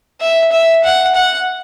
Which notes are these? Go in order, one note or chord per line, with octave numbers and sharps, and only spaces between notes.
E5
E5
F#5
F#5